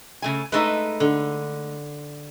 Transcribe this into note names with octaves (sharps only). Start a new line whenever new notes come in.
C#3 A3 G#5
G#3 A3 D#4 B4 A5
D3